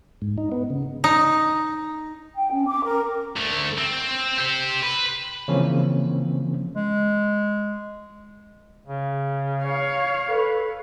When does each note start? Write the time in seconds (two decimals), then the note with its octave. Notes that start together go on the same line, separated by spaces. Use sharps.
0.22 G#2
0.38 D#4
0.52 B3
0.70 C#3
1.04 D#4
2.36 G5
2.52 C#4
2.67 D6
2.85 A#4
3.37 D2 A3
3.78 C4
4.38 G4 C5
4.83 B4
5.48 C#3 E3 F3 A#3 C4 C#4
6.75 G#3
8.86 C#3
9.64 C#5 F5
10.28 A4 B4